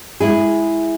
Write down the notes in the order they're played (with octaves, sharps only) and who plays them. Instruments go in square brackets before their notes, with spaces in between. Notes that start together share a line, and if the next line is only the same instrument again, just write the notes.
[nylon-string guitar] G#3 E4 G#4